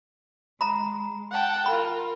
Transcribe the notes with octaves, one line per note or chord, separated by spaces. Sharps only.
G#3 A#5 B5
F#5 G5 A5
F4 A#4 B5